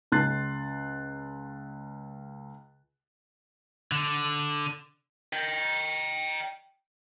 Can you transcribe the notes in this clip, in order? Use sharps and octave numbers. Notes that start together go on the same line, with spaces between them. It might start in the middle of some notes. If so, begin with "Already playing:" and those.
C#2 C6 F#6 A6 C7
D3
D#5 G5